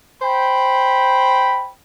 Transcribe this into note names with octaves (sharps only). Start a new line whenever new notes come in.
C5 G5 B5